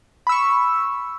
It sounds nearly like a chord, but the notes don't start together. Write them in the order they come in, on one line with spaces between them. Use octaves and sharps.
B5 E6 C#6